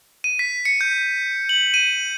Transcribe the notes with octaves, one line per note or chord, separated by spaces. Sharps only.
D#7
B6
C#7
G6
F#7
D#7